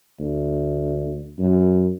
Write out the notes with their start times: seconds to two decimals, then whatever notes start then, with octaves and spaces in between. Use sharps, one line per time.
0.19 D2
1.39 F#2